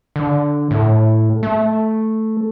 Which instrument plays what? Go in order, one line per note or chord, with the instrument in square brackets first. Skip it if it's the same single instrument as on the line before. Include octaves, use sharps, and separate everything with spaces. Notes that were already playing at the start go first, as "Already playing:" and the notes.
[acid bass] D3
A2
A3